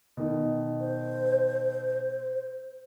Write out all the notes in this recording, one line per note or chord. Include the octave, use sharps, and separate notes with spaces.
B2 D#3
C5